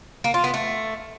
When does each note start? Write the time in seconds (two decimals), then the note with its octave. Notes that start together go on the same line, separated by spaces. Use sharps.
0.24 A#3
0.34 F4
0.44 B3
0.54 A3